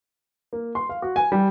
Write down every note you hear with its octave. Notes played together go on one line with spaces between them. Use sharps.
A#3
C6
F5
F#4
G#5
G3